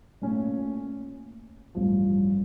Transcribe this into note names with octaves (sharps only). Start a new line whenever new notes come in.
A#2 A3 C#4 F4
A1 G2 F3